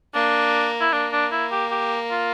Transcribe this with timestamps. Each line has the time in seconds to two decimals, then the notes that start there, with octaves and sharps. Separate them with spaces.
0.14 A#3 D4
0.81 E4
0.92 A#3 D4
1.12 D4
1.32 E4
1.52 G4
1.71 G4
2.11 F4